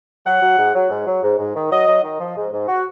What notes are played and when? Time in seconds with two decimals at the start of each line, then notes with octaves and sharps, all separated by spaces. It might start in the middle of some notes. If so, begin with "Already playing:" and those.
0.25 F#3 F#5
0.42 F#3
0.58 G#2
0.74 F#3
0.90 G#2
1.07 F#3
1.23 G#2
1.38 G#2
1.55 D#3
1.70 F#3 D#5
1.87 F#3
2.03 D#3
2.19 F3
2.36 G#2
2.52 G#2
2.68 F#4